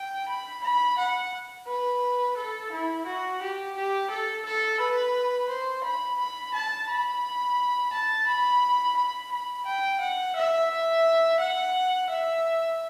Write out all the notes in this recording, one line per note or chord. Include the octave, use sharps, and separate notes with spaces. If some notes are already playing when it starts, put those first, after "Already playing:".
Already playing: G5
B5
B5
F#5
B4
A4
E4
F#4
G4
G4
A4
A4
B4
C5
B5
B5
A5
B5
A5
B5
B5
B5
G5
F#5
E5
E5
F#5
E5